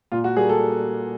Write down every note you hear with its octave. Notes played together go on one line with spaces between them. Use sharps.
A#2 F4
F#4
G3 A#3 G#4
A4